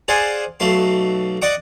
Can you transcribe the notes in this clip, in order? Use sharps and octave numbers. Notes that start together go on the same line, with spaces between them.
G#4 C5 D5 F5 F#5 G#5
B1 A3 F5 C6
D5 D#5 F#5 C#6 D6